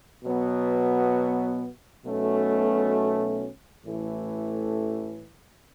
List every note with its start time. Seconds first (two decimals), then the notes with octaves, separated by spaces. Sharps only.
0.24 B2 F#3 B3
2.03 B1 B2 A3 C#4
3.84 A1 A2 E3 A3